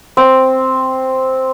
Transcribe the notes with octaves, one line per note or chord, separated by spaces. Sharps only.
C4